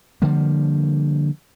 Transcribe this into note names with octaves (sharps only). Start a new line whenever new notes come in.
D3 F3 G3 A#3